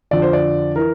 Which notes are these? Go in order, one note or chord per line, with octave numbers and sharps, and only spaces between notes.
F2 D3 F3 D5
C5
D5
E3 A#4